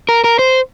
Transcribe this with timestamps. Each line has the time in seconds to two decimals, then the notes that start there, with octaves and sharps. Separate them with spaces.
0.09 A#4
0.24 A#4
0.39 C5